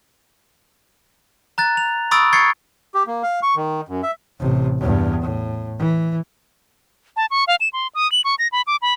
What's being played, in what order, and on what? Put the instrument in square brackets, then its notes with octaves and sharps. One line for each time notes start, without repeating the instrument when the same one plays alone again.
[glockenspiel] A#5 F#6 A6
F7
B5 C#6 D#6 E6 A6 D7
C#6 G#6 A6 C7 C#7
[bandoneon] G4
A#3
F5
C#6
D#3
F#2
E5
[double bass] A1 C3
E2 G2
A2
E3
[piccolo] A5
C#6
F5
E7
C6
D#6
F#7
C#6
A#6
B5
D6
B5